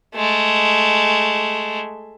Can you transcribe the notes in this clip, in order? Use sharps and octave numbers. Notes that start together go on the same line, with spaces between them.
G#3 A3